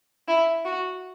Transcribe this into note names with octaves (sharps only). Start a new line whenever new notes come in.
E4
F#4